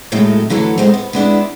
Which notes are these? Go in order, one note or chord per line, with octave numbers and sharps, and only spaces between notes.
A2 C3 F#3 G#3 A3 D#4
D3 E3 F#3 A3 A4
G#3 A3 B3 C4
B3
G#3 B3 D4 E4